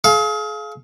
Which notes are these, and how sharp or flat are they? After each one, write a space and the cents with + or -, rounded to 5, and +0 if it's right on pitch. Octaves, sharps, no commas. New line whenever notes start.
G#4 +40 F5 -5